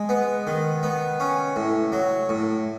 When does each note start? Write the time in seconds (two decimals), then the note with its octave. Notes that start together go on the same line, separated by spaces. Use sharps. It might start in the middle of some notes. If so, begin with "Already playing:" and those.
Already playing: G#3
0.09 B3
0.47 D#3
0.83 B3
1.20 C#4
1.56 A2
1.92 F#3
2.29 A2